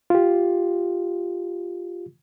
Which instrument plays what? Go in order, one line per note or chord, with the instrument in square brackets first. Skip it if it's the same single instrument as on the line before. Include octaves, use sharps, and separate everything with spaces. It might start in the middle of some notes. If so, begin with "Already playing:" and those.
[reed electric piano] F4 G4